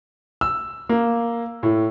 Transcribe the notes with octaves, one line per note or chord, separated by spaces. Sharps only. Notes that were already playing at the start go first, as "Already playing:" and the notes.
E6
A#3
A2